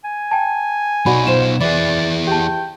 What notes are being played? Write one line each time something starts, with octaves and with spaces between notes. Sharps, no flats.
G#5
G5 A5
B2 B3 D#4 F#4 D5 B5
F4 C5 E7
E3 E4 G#4 B4 D5
G4 G5 A5